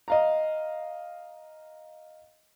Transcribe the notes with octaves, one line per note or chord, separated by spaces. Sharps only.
D#5 F5 A#5